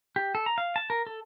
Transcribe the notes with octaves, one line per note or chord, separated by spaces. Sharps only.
G4
A4
A#5
F5
A5
A#4
A4